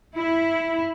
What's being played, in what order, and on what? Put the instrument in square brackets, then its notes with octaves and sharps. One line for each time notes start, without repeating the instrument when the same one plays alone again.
[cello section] E4